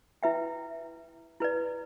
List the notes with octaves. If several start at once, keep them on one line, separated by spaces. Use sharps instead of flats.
E4 B4 E5 G5
E4 B4 D5